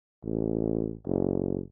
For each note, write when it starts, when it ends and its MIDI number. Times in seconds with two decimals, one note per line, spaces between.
0.23 0.95 33
1.06 1.61 30